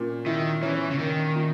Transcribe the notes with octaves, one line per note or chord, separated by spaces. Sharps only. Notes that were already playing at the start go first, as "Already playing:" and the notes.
Already playing: A#2 A#3 C#4
D#3 E4
E3 C#4
C#3
D#3 A#3
A#2